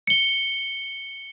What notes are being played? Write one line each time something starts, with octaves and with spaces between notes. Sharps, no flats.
C#7 G7